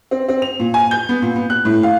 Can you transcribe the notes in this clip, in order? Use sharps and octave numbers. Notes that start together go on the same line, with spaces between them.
C4
C4
F7
A#2
G#5
G6
B3
A#2
B3
F#6
A2
F5